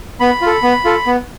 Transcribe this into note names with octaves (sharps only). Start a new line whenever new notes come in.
B3 B5
F4
A4
B3
F4 A4
B3